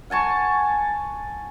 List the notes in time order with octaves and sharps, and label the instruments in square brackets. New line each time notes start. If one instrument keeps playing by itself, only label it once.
[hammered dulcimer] F#5 G#5 A5 C#6